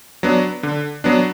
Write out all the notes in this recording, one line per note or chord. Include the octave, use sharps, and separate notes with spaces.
F#3 B3 D4
D3
F#3 B3 D4